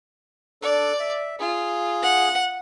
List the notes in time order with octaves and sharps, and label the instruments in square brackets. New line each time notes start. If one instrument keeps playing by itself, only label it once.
[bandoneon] D4 A4 [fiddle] D5
[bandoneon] E5
[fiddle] F4 [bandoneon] G#4
[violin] F#5